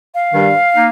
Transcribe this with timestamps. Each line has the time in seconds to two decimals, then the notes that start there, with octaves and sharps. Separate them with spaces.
0.13 F5
0.34 G2 D#3 G3 D4
0.75 A#3 D#4